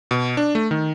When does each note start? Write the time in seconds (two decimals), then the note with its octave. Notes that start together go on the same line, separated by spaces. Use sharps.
0.11 B2
0.37 D4
0.55 A3
0.71 D#3